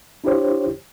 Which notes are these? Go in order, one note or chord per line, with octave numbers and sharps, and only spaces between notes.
D4 E4 F4 G4 C5 C#5